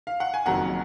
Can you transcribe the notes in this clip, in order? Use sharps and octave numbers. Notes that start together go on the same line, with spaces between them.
F5
F#5
G#5
F#1 F2 D#3 F#3 F#5 A#5